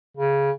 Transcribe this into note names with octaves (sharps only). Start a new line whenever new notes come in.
C#3